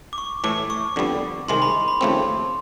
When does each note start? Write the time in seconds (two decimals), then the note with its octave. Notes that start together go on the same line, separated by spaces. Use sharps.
0.13 D6
0.18 C#6
0.44 A2 E3 A3 D6
0.70 C#6
0.96 F2 D3 G3 B3
1.48 C2 C3 D#3 G#3 C6
1.62 B5
1.88 B5
2.01 D#2 C#3 F3 A3 C4